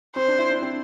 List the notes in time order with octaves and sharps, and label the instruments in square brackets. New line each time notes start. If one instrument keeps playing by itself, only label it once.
[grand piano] C4 [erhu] C5
[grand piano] D4
E4
D4
C4